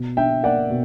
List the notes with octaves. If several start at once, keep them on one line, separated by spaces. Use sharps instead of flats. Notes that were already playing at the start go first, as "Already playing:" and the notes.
Already playing: B2
D4 E5 G5
A#3 D5 F#5
B2